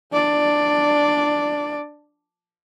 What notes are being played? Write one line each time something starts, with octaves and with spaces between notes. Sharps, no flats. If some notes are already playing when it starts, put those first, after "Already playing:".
D4 D5